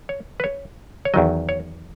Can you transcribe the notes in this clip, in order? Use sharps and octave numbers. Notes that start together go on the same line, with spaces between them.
C#5
B4
C#5
C#5
E2 D#3 F#3 D#5
C#5